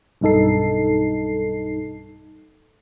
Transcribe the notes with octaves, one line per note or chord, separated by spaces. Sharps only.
B1 G2 D#4 A4 C7